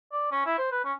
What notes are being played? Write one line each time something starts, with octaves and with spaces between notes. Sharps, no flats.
D5
C#4
E4
C5
B4
C#4